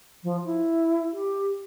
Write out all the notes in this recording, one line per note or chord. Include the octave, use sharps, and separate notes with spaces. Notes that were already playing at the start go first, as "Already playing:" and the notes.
F3
E4
G4